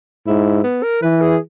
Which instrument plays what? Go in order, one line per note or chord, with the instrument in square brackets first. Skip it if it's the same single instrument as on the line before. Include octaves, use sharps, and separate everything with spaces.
[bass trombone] G#2 [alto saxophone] E4
[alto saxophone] B3
A#4
[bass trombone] E3 [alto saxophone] B4
[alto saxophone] G#4